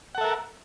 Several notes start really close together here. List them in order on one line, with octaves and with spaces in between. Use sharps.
F#5 A4 E5 A#4